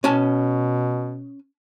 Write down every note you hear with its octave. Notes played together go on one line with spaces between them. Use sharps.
B2 C#4 G#5 A5